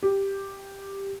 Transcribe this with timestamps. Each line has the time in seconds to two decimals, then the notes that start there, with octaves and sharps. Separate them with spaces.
0.03 G4